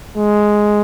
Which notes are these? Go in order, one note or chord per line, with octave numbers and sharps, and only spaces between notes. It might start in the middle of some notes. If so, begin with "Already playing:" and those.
G#3